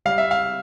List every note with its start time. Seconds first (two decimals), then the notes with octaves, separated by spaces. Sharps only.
0.05 G3 F5
0.18 E5
0.31 F5